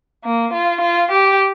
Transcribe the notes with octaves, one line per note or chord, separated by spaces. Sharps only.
A#3
F4
F4
G4